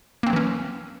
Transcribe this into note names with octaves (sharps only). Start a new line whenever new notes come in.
E3 F#3 A#3 C4 C#4